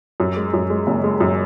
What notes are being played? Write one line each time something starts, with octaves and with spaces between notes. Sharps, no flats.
F#2
G#3
F#2
G#3
F#1
G#3
F#2